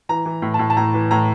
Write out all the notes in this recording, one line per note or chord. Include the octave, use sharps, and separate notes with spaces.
E3 A#5
E3
A2
A5
A2
A5
A2 A#5
E3
A2 A#5